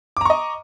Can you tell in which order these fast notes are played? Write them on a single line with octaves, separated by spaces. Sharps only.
D6 A#5 C#6 D#5